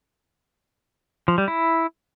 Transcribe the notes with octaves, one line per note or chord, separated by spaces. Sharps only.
F3
G3
E4